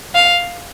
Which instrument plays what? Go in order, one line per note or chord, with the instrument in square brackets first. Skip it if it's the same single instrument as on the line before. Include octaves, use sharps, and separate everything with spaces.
[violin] F5